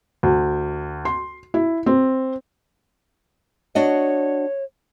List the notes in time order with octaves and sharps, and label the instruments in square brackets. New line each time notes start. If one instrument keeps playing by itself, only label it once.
[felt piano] D2
C6
E4
C4
[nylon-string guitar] D4 F#4 D#5 [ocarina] C#5